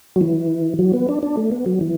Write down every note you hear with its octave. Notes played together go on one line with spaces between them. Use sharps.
F#3
E3
F#3
B3
D4
D4
A3
B3
F#3
E3